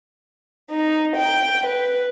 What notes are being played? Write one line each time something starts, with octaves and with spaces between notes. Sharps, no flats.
D#4
G5
B4